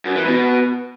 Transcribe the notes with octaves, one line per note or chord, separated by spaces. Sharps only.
F#2
E3
B2